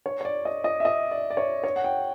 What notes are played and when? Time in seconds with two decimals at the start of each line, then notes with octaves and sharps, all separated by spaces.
0.06 C#5
0.21 C#5
0.25 D5
0.45 D#5
0.64 D#5
0.80 E5
0.85 D#5
1.11 D5
1.30 D5
1.37 C#5
1.64 C#5
1.76 F#5
1.84 G5